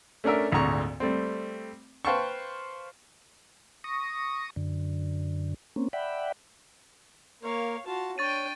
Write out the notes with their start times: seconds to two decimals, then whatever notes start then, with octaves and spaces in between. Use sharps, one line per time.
0.24 A3 C#4 D4 A#4 E5
0.52 G#1 D2 A#2 A4 A#5 C#6
1.00 G3 A3 C4
2.05 B4 C5 F5 G5 A5 C#6
3.84 C#6 D#6 A#6
4.56 F#2 D3
5.76 A#3 C4 C#4
5.93 D5 E5 F#5 G5 B5
7.43 A#3 A#4 C#5 F5
7.86 F4 F#4 A5
8.18 D4 C#5 G5 C#6 A6 D#7